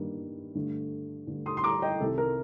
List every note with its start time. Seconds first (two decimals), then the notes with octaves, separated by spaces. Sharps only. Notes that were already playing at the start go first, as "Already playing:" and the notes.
Already playing: G2 D#3 G3 A#3
0.55 G2 D3 A3
1.27 G2 D3 A3
1.46 C6 D#6
1.57 C6
1.64 A#5 D6
1.82 D#5 G5
2.00 C2 C3 D#3 A4
2.18 A#4